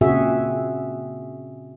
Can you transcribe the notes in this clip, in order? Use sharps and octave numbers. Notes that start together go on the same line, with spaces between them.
A#2 C#3 C4 F#4 G#4 E5